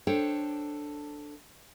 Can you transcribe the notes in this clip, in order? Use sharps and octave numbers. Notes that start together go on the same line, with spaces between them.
D4 A4 C5 C#5 G5